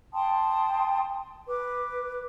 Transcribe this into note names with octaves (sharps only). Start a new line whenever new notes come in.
G5 A5 C6 D#6
B4 D6